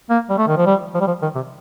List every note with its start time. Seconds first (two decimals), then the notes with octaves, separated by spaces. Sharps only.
0.10 A#3
0.30 G3
0.38 A3
0.47 D#3
0.57 F3
0.66 G3
0.95 F3
1.01 G3
1.07 F3
1.22 D#3
1.35 C3